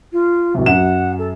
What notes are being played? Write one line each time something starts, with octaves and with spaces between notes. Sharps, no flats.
F4
D1 C2
F#2 F#5 E7
A4